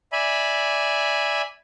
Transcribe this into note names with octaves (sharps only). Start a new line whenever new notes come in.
D5 E5 G#5 B5